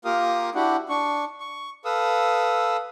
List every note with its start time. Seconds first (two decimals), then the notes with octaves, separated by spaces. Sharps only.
0.05 A#3 F4 G4 A#4 F5 D#6
0.55 D4 E4 F#4 G4 F#5
0.89 D4 C#6
1.40 C#6
1.85 A4 B4 F5 D#6 E6